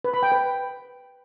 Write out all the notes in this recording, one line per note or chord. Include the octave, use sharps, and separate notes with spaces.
B4
B5
G5
B4